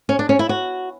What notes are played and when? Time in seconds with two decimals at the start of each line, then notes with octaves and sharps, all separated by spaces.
0.09 C#4
0.19 D4
0.29 C#4
0.39 E4
0.49 F#4